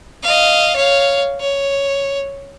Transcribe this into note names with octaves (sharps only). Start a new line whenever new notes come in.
D#5 F5
C#5 F5
C#5